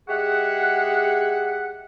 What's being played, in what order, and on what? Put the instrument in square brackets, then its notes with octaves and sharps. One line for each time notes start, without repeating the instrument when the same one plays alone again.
[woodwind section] G#3 G4 G#4 E5 F#5